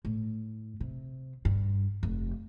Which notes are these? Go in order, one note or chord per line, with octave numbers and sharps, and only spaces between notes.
A2
C3
G2
F1